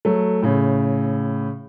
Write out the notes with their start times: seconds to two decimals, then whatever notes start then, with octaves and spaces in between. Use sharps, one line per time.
0.05 F#3 A3
0.42 A2 C#3